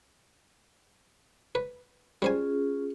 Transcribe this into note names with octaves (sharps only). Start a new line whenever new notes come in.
B4
G3 C#4 F4 G#4 C5 G#5